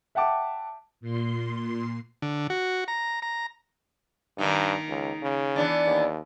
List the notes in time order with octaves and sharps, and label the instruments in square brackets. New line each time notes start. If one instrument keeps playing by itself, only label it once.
[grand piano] E5 F#5 G5 A5 D6
[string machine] A#2 C6
[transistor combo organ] D3
F#4
A#5
A#5
[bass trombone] G2 [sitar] D#3 A#3 D#4
[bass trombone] C#2
C#3
[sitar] E3 B3 D4
[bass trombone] D#2